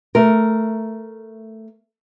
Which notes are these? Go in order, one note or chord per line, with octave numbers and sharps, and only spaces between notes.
A3 A#4